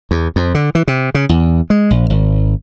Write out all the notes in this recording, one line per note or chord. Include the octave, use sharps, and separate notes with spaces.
E2
F2
D3
E3
C3
C#3
E2
G#3
A#1
G#1